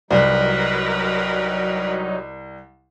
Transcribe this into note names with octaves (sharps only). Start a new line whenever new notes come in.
C2 F#3 G3 D#4 A#4 B4